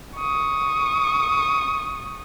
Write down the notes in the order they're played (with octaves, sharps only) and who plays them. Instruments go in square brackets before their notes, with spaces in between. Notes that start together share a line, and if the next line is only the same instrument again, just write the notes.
[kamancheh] C#6 D#6